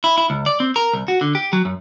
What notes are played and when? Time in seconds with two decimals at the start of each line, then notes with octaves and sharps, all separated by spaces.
0.04 E4
0.18 E4
0.30 C#2
0.46 D5
0.60 C4
0.76 A#4
0.93 C2
1.08 F#4
1.21 D3
1.35 G4
1.53 F#3
1.65 F#2